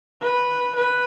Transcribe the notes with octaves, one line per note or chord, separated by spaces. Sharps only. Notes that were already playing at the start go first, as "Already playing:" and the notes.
B4
B4